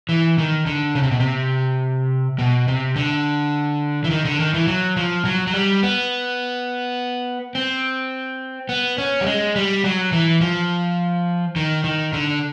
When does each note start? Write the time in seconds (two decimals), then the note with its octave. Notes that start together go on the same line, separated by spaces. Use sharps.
0.09 E3
0.38 D#3
0.66 D3
0.95 C#3
1.03 C3
1.11 B2
1.20 C3
2.39 B2
2.68 C3
2.96 D3
4.04 E3
4.11 D#3
4.25 D3
4.40 D#3
4.54 E3
4.67 F#3
4.97 F3
5.25 F#3
5.47 F#3
5.54 G3
5.83 B3
7.55 C4
8.69 B3
8.98 C#4
9.21 G3
9.26 G#3
9.56 G3
9.84 F#3
10.12 E3
10.41 F3
11.56 D#3
11.84 D#3
12.13 D3